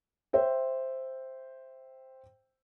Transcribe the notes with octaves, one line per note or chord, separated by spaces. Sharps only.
C5 E5 G5